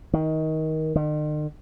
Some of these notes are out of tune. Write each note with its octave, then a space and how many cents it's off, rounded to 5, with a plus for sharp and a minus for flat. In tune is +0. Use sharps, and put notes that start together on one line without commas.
D#3 +20
D#3 -45